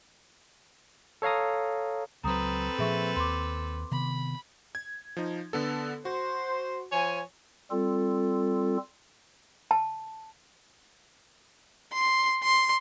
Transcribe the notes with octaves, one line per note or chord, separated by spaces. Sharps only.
A4 C#5 F5 A#5 D#6
C#2 F3 F#3 C4 A4 B4 A#5 D#6
A#2 F3 G#4 E5 C#6
D#2 C6 D6
C3 D#3 B3 B5
G#6
F3 D#4
D3 B3 A4
F#4 C5
F3 C#5 G#5
G3 C4 F4 A4
A5
C6
C6